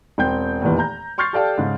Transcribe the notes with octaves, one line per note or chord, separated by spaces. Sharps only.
E1 C4 G5 G6
F1 E2 A#2 D#3 E3
A#5 G6
C6 C#6 F6 G6 A6 C7
G4 A4 D5 F5 G5 A5
G#2 C#3